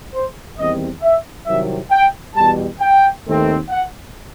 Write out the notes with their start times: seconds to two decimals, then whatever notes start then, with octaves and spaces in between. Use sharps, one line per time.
0.13 C5
0.57 E2 D#3 G3 C4 D#5
1.02 E5
1.46 C2 C3 D#3 F#3 E5
1.91 G5
2.36 E2 B2 G3 A5
2.80 G5
3.25 D#2 D#3 A3 C4
3.70 F#5